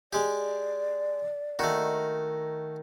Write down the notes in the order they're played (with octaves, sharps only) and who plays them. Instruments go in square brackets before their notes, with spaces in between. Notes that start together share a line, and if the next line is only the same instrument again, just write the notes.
[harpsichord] G#3 G4 [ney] D5
[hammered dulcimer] D#3 [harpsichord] A3 F#4